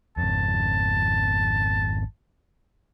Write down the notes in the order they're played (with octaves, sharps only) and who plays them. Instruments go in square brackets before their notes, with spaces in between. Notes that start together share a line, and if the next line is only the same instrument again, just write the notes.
[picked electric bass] G#1 F2 [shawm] A5